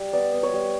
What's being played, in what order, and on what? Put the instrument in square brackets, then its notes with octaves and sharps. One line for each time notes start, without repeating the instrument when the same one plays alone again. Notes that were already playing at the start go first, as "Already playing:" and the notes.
Already playing: [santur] G3
B3 D5
B3
C#5
G3